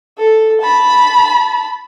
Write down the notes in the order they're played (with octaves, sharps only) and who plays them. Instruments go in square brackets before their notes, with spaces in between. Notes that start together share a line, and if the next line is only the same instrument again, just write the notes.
[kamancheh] A4
A5 B5